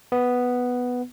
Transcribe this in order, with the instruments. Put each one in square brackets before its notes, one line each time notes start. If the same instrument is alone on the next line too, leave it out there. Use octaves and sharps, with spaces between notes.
[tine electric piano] B3